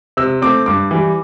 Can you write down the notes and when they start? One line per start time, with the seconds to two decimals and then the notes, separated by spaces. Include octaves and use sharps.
0.17 C3 E6
0.42 A3 C4 D6
0.66 G2 D6
0.91 E3 G3